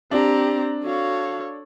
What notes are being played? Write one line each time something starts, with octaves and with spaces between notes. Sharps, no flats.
C4 D4 G4 A#5
F#4 A4 C#5 F5